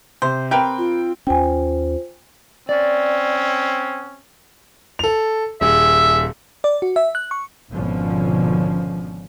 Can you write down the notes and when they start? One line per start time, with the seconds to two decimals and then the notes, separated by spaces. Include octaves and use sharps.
0.22 C3 C5
0.51 C4 G4 A#4 B4 G5
0.78 F4
1.27 D#2 C#4 F4 C5 G5 G#5
2.69 C4 C#4 D5
4.99 A4 F7
5.61 D#1 G#4 E5
6.64 D5
6.82 F#4
6.96 E5
7.15 F#6
7.31 C#6
7.71 G#1 B2 D3 F3 C#4